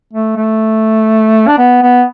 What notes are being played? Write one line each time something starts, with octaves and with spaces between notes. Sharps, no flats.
A3
A3
D4
B3
B3